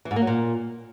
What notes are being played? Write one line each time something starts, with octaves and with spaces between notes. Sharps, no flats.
E3
G#2
A#3
F#3
A#2